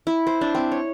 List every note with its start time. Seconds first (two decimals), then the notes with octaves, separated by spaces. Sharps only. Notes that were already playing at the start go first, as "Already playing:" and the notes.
0.07 E4
0.27 C5
0.41 D4
0.55 C4
0.72 C#5